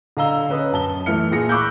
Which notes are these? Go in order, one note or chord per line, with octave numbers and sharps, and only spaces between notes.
D3 D#5 F5 A#5 E6 G7
C#4 B4 D#5 D#6
F#2 A5 G7
E3 A3 E4 F6 C#7
A#2 G#4 A#6 C#7
B5 C#6 D6 E6 F#6 G6